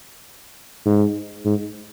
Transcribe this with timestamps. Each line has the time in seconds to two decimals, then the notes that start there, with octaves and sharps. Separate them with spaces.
0.86 G#2
1.45 G#2